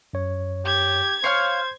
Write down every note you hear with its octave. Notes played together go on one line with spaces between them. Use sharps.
F#2 C#5
G4 G#6
C5 C#5 F5 F6 C7